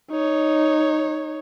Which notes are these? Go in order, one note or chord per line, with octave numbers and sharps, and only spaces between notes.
D#4 C#5